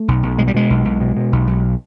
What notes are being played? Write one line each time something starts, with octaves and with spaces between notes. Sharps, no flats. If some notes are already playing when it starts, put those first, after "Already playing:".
Already playing: A3
B1
B1
B2 G#3
G3
B2 G#3
B1
B1
B2
B2
B1
B1